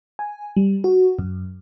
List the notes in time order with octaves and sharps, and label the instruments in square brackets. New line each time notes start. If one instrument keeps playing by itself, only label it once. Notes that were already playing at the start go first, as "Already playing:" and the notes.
[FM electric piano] G#5
G3
F#4
F#2